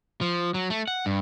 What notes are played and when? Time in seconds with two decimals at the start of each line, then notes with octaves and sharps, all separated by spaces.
0.21 F3
0.54 F#3
0.70 A3
0.88 F#5
1.06 G2